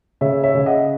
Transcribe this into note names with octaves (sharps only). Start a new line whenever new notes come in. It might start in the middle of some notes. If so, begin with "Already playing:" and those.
C#3 C#5 E5
C#5 E5
C#3 E5
D#5 F#5